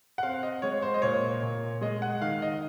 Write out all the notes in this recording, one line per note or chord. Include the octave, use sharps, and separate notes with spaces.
F#5
C4 F5
D#5
G#3 C#5
C5
D#5
A#2 C#5
A#2
G#3 D#5
F#5
D#3 F5
D#5